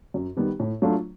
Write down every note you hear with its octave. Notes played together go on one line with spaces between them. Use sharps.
F#2
D#3 G3 B3
A2
F#3 A3 D4 F4